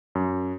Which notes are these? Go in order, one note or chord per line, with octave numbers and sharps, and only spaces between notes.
F#2